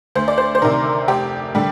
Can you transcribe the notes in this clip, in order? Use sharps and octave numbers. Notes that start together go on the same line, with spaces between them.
D2 C5
D5
C5
C5
C3 D#3 A#4
F1 G4
D3 G3